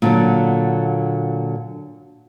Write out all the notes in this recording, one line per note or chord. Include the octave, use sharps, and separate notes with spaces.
A#2 D3 F#3